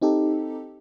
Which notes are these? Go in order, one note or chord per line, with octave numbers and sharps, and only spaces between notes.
C4 D#4 G4 A4